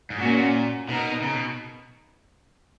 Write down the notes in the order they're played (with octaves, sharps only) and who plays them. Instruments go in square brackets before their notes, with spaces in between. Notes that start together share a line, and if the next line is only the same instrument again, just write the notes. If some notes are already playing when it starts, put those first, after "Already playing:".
[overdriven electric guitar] G#2
[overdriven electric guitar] A#2 [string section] A#3 C#4 F#4
[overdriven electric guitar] B2 [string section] B3 D#4 A#4
[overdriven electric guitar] C#3
B2